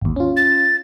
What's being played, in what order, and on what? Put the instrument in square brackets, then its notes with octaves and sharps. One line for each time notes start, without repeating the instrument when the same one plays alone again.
[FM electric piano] G#1 D#2
C#4 F4
[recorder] A6